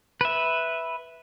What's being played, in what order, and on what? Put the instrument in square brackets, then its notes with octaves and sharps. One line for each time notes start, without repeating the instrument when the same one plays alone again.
[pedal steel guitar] B4 E5